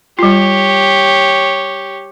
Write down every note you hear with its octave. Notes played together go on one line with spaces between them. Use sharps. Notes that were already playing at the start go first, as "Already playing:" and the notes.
G3 F4 G4 C#5